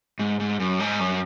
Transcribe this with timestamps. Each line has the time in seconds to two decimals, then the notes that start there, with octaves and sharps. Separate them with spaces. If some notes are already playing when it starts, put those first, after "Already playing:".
0.19 G#2
0.40 G#2
0.60 F#2
0.80 G#2
0.99 F#2